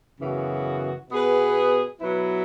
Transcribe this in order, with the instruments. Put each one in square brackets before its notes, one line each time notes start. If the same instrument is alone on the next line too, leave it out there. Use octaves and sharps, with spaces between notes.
[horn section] F#2 C#3 E3 B3 F#4
B2 B3 G#4 B4
B2 F#3 E4 B4